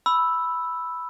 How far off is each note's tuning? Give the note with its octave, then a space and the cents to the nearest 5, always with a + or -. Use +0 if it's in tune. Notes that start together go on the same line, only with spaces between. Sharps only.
B5 +0 E6 +0